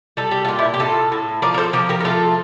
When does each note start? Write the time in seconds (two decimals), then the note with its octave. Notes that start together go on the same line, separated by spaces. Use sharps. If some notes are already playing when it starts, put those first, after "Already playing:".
0.17 G3 A4
0.31 G4
0.45 A#2 F4
0.59 E4 G4
0.74 G4
0.80 A2 F4 A4
1.12 A2
1.42 F3 A#4 D5
1.54 A#4
1.58 A4 C5
1.73 F3 G4 A#4
1.89 G4 A#4
2.00 A#4
2.04 A3 F4 A4